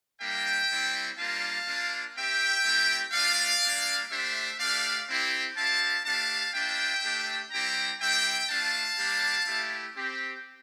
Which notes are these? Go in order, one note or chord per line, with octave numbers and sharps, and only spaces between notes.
G3 A#3 D4 E5 G5
G3 C4 E4
G3 A#3 D4 F4 F5 A5
A#3 D4 F4
C4 G4 E5 G5
A3 C4 E4 G4
A3 D4 F4 D5 F5
G3 A#3 D4
A3 D4 G4 C5 E5
A3 D4 G4 D5 F5
C4 E4 G4
C4 E4 G4 F5 A5
A3 D4 G4 F5 A5
A#3 D4 F4 E5 G5
A3 D4 G4
G3 C4 E4 G4 G5 A#5
G3 C4 E4 G4 E5 G5
A3 D4 F4 F5 A5
G3 A#3 D4 G4
A3 E4 G4
C4 G4